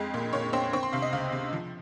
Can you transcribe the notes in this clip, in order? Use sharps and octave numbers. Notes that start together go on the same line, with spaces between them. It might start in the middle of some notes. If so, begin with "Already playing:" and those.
Already playing: F2 G#3
A#2
A#2 C#5
C4 C6
C4 C#6
C6
C3 F5
D#5
C#2 F5
C3
F3